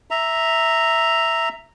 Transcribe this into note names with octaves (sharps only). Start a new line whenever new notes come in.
E5 A#5